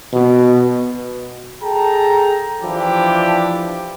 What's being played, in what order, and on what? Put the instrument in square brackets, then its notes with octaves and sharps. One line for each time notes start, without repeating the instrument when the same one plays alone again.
[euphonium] B2
[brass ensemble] G#4 A4 G5 A5 A#5
E3 F3 D4 E4 G4